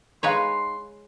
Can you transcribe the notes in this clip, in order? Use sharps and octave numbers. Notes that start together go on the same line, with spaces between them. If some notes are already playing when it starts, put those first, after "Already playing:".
G#3 D#4 B4 C#5 D#5 F5 C6